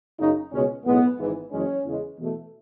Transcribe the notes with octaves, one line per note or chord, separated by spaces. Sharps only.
F#1 F#2 C#3 D#4
C#2 B2 G#3 C#4
B1 A2 G#3 B3
G#1 G#2 E3
F#1 F#2 E3 G#3 C#4
E2 C#3 G#3
E2 B2 A3